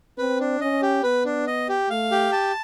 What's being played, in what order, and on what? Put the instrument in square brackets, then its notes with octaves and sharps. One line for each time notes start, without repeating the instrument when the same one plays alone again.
[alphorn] C4 [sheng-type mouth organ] B4
[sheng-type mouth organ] D4
[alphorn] C#4 [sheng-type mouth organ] D#5
[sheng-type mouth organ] G4
[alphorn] B3 [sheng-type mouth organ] B4
[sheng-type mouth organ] D4
D#5
G4
[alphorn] A3 [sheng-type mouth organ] F5
[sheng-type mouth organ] G4
A5